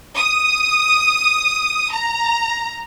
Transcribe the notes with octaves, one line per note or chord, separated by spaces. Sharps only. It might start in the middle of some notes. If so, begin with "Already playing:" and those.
D#6
A#5